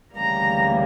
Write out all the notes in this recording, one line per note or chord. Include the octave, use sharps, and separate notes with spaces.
D2 C#3 E3 G3 A#3 A#5